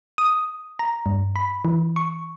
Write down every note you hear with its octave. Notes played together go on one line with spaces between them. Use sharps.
D#6
A#5
G2
B5
E3
C#6